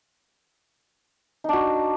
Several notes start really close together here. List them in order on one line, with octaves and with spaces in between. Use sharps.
D#4 D4 F#4